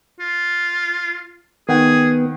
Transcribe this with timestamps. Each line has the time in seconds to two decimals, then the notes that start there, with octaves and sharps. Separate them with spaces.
0.20 F4
1.69 D#3 B3 G#4 F#5 G5